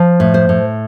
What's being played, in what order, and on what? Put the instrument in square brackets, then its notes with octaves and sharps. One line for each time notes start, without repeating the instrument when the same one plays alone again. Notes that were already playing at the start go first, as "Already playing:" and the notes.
Already playing: [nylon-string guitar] F3
A2
C5
A2